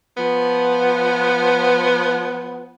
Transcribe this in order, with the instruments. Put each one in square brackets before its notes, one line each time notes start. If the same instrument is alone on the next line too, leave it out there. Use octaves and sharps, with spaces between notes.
[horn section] F3 B3